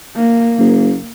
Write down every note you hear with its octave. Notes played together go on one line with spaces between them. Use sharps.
A#3
F#1